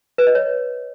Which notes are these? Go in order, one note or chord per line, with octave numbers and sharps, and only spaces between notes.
B4
D#5
C#5